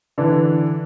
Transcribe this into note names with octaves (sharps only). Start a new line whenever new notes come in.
D3 E3 D4 E4